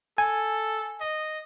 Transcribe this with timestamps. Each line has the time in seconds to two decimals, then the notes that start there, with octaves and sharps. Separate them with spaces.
0.18 A4 G#5
1.00 D#5